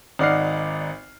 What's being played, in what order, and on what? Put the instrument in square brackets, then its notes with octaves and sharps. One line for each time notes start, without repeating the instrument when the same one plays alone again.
[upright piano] G#1 D#4 D5 F#5 F6 C7